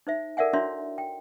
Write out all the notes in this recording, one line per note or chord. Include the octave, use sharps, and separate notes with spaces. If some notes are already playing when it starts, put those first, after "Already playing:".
D#4 C5 E5
A4 A#4 D5 E5 F#5 G#5
D4 E4 F#4 C#5 E5 C6
G5